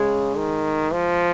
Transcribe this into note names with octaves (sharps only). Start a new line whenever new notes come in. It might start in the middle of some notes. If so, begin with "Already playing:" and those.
Already playing: C#3 G#3 G#4
D#3
F3